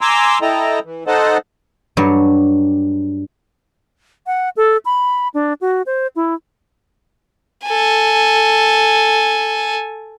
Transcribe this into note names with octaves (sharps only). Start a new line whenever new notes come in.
G#5 A#5 C6 D6 E6
E4 A4 D#5 G5 A#5
E3
D#4 A4 C5 D#5 F#5 A5
G2 F#3 C#5
F#5
A4
B5
D4
F#4
C5
E4
A4 G#5